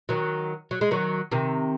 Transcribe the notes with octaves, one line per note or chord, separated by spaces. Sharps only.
D#3 F#3
F#3
G#3
D#3 F#3
C3 D#3